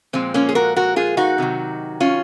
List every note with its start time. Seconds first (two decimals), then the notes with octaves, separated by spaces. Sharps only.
0.13 A#2 F3 G#3 C4
0.34 A#3 C#4
0.49 G#4
0.55 F#4 A#4
0.76 F#4 A#4
0.96 F4 G#4
1.17 D#4 F#4
1.38 C3 D#3 F#3
2.00 C#4 F4